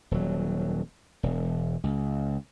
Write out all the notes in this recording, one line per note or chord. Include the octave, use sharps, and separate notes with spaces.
D#1 F#3
E1
C#2